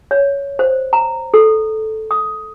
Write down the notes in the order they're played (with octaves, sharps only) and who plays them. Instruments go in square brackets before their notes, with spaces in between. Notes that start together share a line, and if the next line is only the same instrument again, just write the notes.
[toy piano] C#5
C5
A#5
A4
D#6